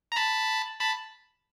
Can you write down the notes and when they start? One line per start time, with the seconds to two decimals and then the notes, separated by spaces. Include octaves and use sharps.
0.12 A#5
0.16 A5 B5
0.80 A5 B5